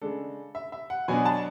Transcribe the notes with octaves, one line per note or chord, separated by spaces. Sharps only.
C#3 G#3 D4 A4
E5
E5
F#5
B2 F#3 B3 D4 G#5
A5